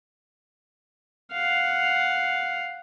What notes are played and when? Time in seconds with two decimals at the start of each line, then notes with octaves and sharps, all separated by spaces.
1.32 F5 F#5